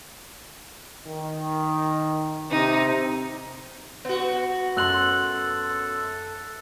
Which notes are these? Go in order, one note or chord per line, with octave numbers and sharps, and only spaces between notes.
D#3
C3 D#4
B3 F#4
F#2 A4 C6 E6 F#6 F#7